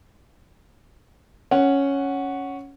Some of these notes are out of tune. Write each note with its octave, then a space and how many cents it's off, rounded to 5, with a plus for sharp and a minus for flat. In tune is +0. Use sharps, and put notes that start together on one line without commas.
C#4 +0 F#5 +0